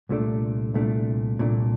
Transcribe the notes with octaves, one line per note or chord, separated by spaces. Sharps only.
C2 A#2 A3 D4
C2 A#2 A3 D4
C2 A#2 A3 D4